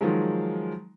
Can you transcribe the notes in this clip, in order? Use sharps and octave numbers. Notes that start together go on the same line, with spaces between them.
D#3 F3 F#3 G#3